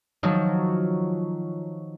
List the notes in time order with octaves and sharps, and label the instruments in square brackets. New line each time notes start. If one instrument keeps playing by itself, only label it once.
[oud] D#3 F3 F#3